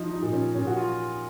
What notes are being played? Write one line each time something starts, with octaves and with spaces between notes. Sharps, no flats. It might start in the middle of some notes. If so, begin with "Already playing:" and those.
Already playing: F3 D#4
D#4
A#2
C#4
A#2 C#4
F#4
F4